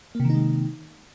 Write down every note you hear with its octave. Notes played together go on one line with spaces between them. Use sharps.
C3 D#3 G#3 A#3 D#4